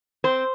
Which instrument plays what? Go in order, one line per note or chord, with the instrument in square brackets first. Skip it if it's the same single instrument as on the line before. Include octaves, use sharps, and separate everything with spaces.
[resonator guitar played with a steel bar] C4 C5